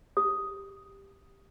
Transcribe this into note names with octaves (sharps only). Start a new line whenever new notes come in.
G4 D#6